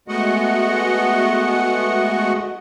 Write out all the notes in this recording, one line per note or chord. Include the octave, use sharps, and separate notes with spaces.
G#3 A3 B3 F#4 D#5 F#5